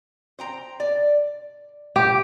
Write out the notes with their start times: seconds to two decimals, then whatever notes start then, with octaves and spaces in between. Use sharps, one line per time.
0.39 C5 G5 A#5
0.80 D5
1.96 G4